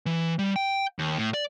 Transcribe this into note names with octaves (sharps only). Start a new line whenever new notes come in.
E3
G3
G5
D#2
A2
D5